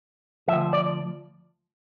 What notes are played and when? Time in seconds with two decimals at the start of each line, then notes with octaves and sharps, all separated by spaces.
0.48 D2 C3 F3 E5
0.73 D5